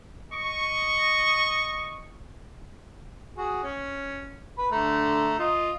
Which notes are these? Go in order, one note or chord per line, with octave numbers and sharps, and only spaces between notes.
D#5 C#6
F#4 G#4
C#4
B4 B5
D3 A3 A#5
F4 D#5